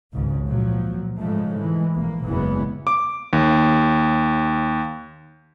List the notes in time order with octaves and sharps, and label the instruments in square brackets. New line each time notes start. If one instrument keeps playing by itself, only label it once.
[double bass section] G#1 C#2 G#2 C#3
A#2 F3 F#3
G#2 C#3 F3 G#3 A3
E3 G#3
A#1 A#3
F#1 E2 C#3 E3 G#3 B3
[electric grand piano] D6
D#2